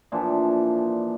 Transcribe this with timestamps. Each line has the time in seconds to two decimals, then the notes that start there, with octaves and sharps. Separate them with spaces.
0.12 A#2 E3 F3 D4